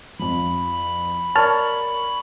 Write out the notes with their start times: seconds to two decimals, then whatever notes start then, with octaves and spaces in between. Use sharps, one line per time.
0.19 F2 F3 B5
1.36 A#4 C#5 D5 A5 F6